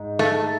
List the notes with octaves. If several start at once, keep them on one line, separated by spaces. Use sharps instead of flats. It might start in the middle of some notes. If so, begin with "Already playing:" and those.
Already playing: G#2
A3